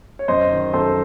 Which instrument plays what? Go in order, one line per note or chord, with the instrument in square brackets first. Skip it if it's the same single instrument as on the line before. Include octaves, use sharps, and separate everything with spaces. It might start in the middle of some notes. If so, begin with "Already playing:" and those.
[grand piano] C#5
F#2 C5 D#5
D#3
F#2 A4 C5